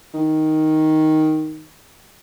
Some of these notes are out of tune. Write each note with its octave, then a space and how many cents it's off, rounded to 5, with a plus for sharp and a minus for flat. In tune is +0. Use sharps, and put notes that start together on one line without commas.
D#3 +5